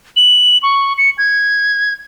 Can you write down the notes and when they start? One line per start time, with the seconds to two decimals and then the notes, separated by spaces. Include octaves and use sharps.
0.16 F#7
0.63 C#6
0.98 C#7
1.18 G#6